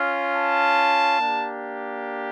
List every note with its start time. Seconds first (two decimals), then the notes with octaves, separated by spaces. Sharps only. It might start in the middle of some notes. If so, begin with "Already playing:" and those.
Already playing: C#4 F4
0.36 A5
1.21 A#3 D4 G4